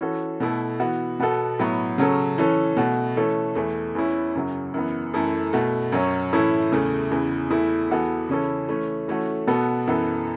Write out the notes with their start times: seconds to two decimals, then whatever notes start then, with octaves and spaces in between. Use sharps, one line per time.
0.01 E3 C#4 F#4 A4
0.40 B2 A3 E4 A4
0.80 E3 B3 F#4
1.20 B2 B3 F#4 A4
1.59 A2 F#3 B3
1.98 C#3 F#3 C#4 A4
2.38 E3 C#4 A4
2.77 B2 A3 F#4
3.17 E3 A3 C#4 A4
3.55 E2 E3 A3
3.95 E2 E3 C#4 E4
4.35 F#2 C#3 F#3
4.74 F#2 E3 B3
5.14 F#2 E3 A3 E4 A4
5.53 B2 A3 F#4
5.92 F#2 F#3 C#4
6.33 A2 E3 C#4 E4 A4
6.72 E2 C#3 A3
7.11 E2 C#3 E3
7.50 E2 E3 A3 E4
7.90 E2 E3 B3 F#4 A4
8.29 C#3 E3 C#4 E4 A4
8.68 E3 A3 C#4
9.08 E3 A3 C#4 F#4 A4
9.47 B2 B3 F#4 A4
9.87 F#2 E3 B3 A4